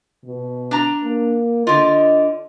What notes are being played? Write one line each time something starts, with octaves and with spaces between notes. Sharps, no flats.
B2
D4 A#5
A#3
D3 F4 D#5